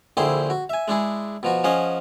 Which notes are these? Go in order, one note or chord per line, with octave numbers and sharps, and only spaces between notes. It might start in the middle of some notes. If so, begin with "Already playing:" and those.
A#1 D3 E4 G#4 C5 G5
F#4
E5 G#5
G#3 D4 E4 G#4
B2 F3 F#4
F3 C#4 G#4 D#5 F#5